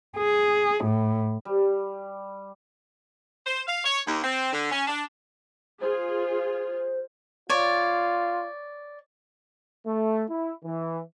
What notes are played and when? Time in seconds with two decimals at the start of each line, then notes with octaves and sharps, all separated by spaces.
0.18 G#4
0.84 A2
1.45 G3
3.47 C5
3.67 F5
3.85 C#5
4.07 D#2
4.24 C4
4.53 D3
4.72 C#4
4.88 D4
5.81 F4 G#4 C5
7.49 F4 C#5 D5
9.86 A3
10.30 E4
10.64 E3